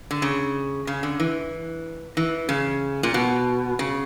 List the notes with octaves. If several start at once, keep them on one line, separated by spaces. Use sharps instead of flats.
D3
C#3
C#3
D3
E3
E3
C#3
A#2
B2
C#3